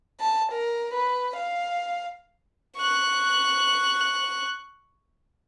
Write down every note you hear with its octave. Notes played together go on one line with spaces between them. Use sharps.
A5
A#4
B4
F5
C#6 F#6